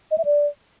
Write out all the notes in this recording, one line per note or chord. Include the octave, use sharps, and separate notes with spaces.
D#5
E5
D5